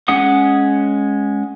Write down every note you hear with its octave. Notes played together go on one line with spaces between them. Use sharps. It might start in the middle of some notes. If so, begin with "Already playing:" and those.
G#3 C#4 F#5 D#6